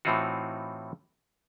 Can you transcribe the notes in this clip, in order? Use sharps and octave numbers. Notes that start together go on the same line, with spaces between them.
A2 E3 C4 D#4 F4 F#4